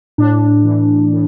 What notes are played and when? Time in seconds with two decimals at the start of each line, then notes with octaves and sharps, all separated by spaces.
0.18 A2 D4
0.64 E3
1.11 A2